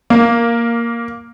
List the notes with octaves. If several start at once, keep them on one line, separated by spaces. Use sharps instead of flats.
A#3